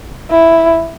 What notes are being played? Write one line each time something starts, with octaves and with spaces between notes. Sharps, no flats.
E4